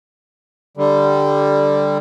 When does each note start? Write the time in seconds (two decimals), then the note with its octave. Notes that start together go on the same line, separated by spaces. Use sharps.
0.77 D3 G3